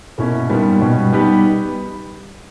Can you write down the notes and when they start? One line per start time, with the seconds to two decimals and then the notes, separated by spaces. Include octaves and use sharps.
0.18 B2 A#3 C#4 E4 A#4
0.49 A#2 G3 B3 D#4
0.81 B2 G3 C#4
1.13 G3 B3 D#4 G4 B4